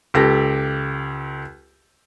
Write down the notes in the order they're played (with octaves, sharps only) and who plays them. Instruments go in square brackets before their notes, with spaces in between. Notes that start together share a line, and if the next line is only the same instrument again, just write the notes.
[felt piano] C#2 G4 A4 A#6